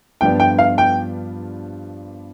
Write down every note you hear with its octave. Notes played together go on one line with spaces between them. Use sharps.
G2 F3 B3 D4 F4 G5
G5
F5
G5